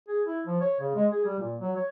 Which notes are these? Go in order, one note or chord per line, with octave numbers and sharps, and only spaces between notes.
G#4
E4
F3
C#5
C#3
G#3
G#4
G3
A#2
F#3
C#5